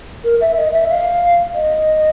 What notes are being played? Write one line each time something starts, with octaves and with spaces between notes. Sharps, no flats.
A#4
E5
D#5
E5
F5
D#5